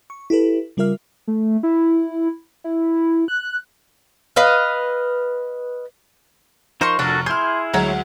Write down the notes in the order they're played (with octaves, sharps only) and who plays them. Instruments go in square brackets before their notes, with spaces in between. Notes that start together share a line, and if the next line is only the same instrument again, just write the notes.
[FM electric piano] C#6
E4 G4 A4 B4
C#3 G3 F4 A#4 E5 F6
[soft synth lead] A3
E4
E4
F#6
[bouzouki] B4 D#5 F5
[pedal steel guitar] F3 D#4 C5 [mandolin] A#4 C6 C#6
[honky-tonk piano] F1 C#6 F6 [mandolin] D4 [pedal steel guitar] F#4 A4 A#4
[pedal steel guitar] E4 G#4 [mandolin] C6 [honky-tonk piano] F6 G6
[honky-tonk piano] D2 F#3 G#3 [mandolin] C#5 A#5